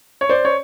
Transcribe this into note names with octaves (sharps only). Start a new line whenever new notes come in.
C#5
C5 D5
C#5